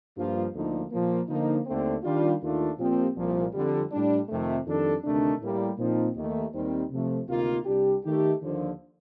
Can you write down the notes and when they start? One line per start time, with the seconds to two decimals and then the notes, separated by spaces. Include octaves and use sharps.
0.17 G2 F3 A#3 F4
0.54 D2 D3 F3 A#3 D#4
0.91 A#2 F3 A#3
1.29 D3 F3 A#3 D#4
1.66 D#2 D3 A3 C4
2.04 D#3 G3 D4 F4
2.42 D#2 D#3 A3 D4 F4
2.78 A#2 F3 C4 G4
3.16 C2 A#2 F3
3.54 F2 D3 G3
3.91 A2 G3 D4
4.28 F2 C3 D#3 A3
4.66 F2 D#3 G3 D4 A4
5.04 D2 C3 D#3 A3 D4
5.40 A2 G3 A#3
5.79 A#2 F3 C4 D#4
6.15 D#2 D#3 A3
6.54 D#2 D#3 G3 C4
6.91 C3 F3 A3
7.28 D2 C3 D#3 A#3 F4
7.65 C2 C3 G3 D4 G4
8.04 D#3 A3 D#4 G4
8.41 D#2 D3 F3